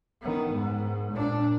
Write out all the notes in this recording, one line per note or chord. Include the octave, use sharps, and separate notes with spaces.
D#3 B3
G#2
A#2 D4